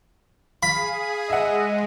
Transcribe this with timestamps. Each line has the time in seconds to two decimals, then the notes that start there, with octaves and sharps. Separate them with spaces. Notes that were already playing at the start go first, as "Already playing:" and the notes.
0.63 G#4 F5 B5
1.30 G#3 D#5 E5 F#5